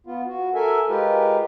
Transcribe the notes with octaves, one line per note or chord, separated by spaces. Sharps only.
B3 F4
F#4
A4 A#4 E5 G#5
G#3 F4 G4 A#4 B4